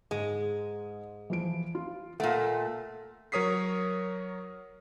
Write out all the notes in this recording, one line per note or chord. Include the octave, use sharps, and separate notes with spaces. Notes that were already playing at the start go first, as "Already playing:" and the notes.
G#2 G#3
E3 F3 D7
F4
A#2 A3 F#5
F#3 A#4 C#5 D#6 B6 C7